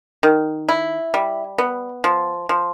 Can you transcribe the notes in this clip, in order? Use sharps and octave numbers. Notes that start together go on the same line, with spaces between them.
D#3
E4
G3
B3
F3
F3